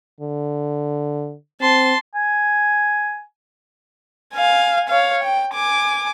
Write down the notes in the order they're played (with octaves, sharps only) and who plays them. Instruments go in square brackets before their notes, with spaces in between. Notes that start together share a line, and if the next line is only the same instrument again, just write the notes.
[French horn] D3
[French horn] C4 [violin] A5 C6
[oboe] G#5
[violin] F5 G#5
C#5 F5
G5
G#5 D6